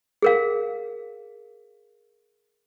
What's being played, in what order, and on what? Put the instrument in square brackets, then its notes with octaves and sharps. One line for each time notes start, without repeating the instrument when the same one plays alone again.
[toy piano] G#4 A#4 F5